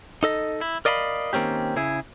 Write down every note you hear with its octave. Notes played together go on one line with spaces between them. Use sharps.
D#4 A4 D#5
E4
A#4 D5 D#5 F5 A#5 B5
D#3 A#3 C4 C#4 G4
C#3 E4 G#4